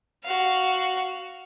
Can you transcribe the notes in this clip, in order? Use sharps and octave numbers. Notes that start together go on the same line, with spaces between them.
F#4 F5